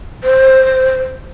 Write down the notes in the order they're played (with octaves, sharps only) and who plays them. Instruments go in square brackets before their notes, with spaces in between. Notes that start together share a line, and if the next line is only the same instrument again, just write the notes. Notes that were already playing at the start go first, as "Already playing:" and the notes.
[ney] C5